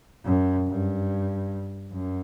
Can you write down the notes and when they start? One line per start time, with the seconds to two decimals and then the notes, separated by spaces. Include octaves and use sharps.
0.24 F#2
0.66 G2
1.93 F#2